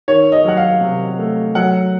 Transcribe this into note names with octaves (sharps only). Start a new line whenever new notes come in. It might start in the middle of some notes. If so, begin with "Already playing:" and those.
D#3 C#5
D#5
F#3 F#5
F5
C3
A3
F#3 F#5